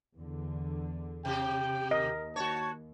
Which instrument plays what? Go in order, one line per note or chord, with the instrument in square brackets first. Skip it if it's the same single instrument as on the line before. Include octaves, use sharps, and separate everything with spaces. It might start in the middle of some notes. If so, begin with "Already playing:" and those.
[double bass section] E2 D3
[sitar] C3 G4 [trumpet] G5
[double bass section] D#2 [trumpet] A#4 [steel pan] D#5
[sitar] F#4 C#5 [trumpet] A5